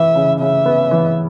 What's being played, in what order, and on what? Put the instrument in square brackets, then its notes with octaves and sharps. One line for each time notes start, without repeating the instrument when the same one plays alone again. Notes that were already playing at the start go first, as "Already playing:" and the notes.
Already playing: [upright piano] E3 [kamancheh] E5
[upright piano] C#3
[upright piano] C#3 [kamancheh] E5
[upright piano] B3
E3